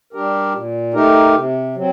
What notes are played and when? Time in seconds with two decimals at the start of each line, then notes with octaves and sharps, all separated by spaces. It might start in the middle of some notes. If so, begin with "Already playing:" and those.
0.13 G3 D4 G4 A#4
0.54 A#2
0.94 A3 D#4 G4 A#4
1.35 C3
1.75 F#3 C4